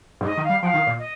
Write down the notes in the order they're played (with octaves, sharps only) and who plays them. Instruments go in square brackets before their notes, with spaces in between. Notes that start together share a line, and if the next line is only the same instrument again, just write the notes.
[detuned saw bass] G2
[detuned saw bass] G#2 [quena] D#5
[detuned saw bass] D#3
[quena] F5
[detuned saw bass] G3
[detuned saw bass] F3 [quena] G5
[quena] F5
[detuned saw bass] D#3
A#2
[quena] D#5